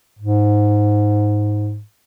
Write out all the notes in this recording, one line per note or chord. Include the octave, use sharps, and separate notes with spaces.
G#2